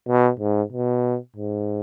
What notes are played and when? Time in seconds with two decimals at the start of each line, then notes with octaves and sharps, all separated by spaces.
0.08 B2
0.40 G#2
0.72 B2
1.36 G#2